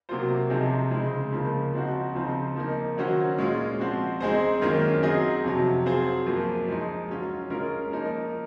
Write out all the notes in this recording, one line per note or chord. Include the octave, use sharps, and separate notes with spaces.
C3 F#3 A#3 F4 C5
C3 F3 C4 D#4 G#4
C#3 G#3 C4 D#4
C#3 F3 A#3 F4
F3 C4 D#4 F#4
C#3 F3 C4 D#4
F3 A#3 D#4
D#3 F#3 C#4 F#4 C5
A#2 G#3 C#4 F4
F3 C4 F#4
G#3 C4 D#4 G#4 C5
F#2 D#3 A#3 C#4 F4
F#3 C4 D#4 G#4 D#5
F2 C3 F#3
F#3 C4 F4 G#4 C5
F#2 F3 A#3
F3 G#3 D#4
F#3 C#4 F4
G#3 C#4 F4 A#4
F3 A#3 D#4 A#4